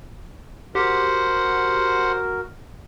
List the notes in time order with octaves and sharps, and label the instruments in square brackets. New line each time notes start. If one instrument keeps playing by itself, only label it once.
[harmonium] F#4 A#4 [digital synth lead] G4 [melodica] C5 F#5